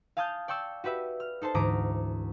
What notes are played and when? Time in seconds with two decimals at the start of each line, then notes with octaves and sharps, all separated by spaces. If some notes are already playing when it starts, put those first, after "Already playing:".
0.17 F5 G#5 A5 D#6 F6 G6
0.48 D5 G5 C#6 E6 A6
0.84 F#4 G4 B4 E5
1.20 F6
1.42 D#4 A4 C5 A5
1.54 D2 G#2 E3 A#5 D6 D#6